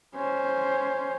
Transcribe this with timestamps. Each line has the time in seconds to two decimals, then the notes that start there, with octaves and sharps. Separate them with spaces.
0.15 C#4 C5